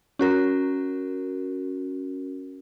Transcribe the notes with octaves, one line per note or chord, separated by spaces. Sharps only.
C#4 F#4 A#4